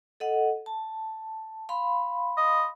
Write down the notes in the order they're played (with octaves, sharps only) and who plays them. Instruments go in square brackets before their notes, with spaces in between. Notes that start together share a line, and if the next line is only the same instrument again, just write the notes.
[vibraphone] A4 D#5 F#5
A5
F5 B5 C6
[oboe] D#5